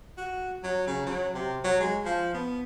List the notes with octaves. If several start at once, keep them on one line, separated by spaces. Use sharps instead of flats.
F#4
F#3
C#3
F#3
C3
F#3
G#3
F3
B3